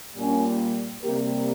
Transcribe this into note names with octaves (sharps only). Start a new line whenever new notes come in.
A#2 G3 A#3 C#4
C3 G3 A#3 G4 A#4